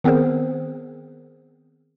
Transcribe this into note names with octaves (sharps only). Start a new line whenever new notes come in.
D#3 B3 C4 G#4 A#4 C5